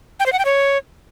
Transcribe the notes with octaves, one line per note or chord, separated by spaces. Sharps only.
G5
C5
F#5
G5
C#5